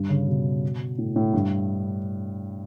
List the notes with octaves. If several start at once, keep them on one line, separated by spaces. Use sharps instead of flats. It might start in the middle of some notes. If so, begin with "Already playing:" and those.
Already playing: G2
C#3
B2
A2
A2
G2